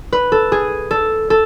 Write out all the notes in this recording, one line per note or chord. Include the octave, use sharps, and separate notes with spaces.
B4
A4
G#4
A4
A4